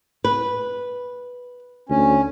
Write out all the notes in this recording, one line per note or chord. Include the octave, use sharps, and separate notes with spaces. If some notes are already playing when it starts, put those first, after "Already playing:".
B4
D2 C#4